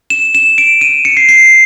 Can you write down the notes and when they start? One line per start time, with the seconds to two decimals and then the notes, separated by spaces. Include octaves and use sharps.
0.10 E7
0.35 E7
0.58 D7
0.81 D#7
1.05 C#7
1.17 C7
1.29 C7